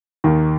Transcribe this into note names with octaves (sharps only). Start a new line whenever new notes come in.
D#2 D#3